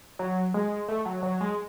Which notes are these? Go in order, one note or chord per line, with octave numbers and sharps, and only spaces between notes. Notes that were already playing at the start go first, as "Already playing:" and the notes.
F#3
G#3
A3
F#3
F#3
G#3